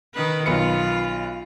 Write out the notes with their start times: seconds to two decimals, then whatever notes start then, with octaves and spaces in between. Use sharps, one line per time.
0.14 D#3 B4
0.46 B1 F4 B4 C#7